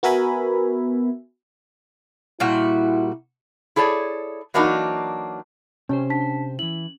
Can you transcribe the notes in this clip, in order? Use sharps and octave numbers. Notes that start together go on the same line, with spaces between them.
B3 F#4 A#4 E5 G#5 B5
A#2 G3 E4 F#4
E4 G#4 A4 C#5 D5
E3 F#3 A#3 D4 D#4 F#4
C3 C#4 G4 C5
D4 A5 B6
E3 E4 F#7